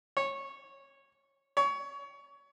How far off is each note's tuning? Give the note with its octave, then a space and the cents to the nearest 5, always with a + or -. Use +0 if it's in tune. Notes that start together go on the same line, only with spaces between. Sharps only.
C#5 -15
C#5 +20